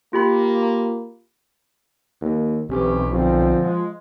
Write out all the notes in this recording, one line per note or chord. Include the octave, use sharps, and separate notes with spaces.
A#3 F4 G4 B5
D#2
B1 C3 E3 C#4 G4
A#2 D3 F3 C4
G#3